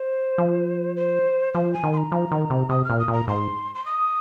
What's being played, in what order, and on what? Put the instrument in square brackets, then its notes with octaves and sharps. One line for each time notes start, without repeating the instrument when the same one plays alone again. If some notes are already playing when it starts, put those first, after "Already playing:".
Already playing: [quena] C5
[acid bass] F3
[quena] C5
[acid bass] F3 [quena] C5
[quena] G#5
[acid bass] D#3
[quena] C6
A#5
[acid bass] F3
D#3
C3
[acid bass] C3 [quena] D#6
[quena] F6
[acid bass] A#2
[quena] D#6
[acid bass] A#2 [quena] A#5
[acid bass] G#2 [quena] C6
[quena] C6
D#6